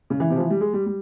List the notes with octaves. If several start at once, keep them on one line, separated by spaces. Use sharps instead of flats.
C#3
E3
C3
F3
E3
G3
G#3
G3
G3